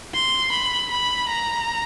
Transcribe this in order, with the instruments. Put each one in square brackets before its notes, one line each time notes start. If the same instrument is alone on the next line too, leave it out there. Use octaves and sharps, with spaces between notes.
[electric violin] C6
B5
B5
A#5